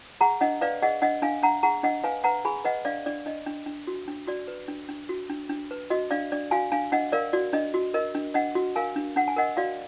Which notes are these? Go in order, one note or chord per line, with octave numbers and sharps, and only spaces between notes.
G#4 F#5 A#5
D4 D#5 F#5
B4 D5 F5
G#4 D#5 F#5
D4 D#5 F#5
D4 F5 G#5
D4 F#5 A#5
G#4 F#5 A#5
D4 D#5 F#5
B4 F5 G#5
B4 F#5 A#5
G#4 G#5 B5
B4 D#5 F#5
D4 D5 F5
D4 D5
D4 D#5
D4
D4
F#4
D4
F#4 D5
B4
D4
D4
F#4
D4
D4
B4
F#4 D#5
D4 D5 F5
D4 D5
F#4 F5 G#5
D4 F5 G#5
D4 D#5 F#5
A#4 D5 F5
F#4 D5
D4 D#5
F#4
A#4 D#5
D4
D4 D#5 F#5
F#4
A#4 F5 G#5
D4
D4 F#5
G#5
A#4 D#5 F#5
F#4 D5 F5